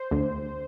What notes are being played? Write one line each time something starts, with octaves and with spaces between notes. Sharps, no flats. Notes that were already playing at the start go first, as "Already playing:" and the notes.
Already playing: C5
D2